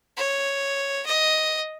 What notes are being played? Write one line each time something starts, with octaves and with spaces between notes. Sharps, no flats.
C#5
D#5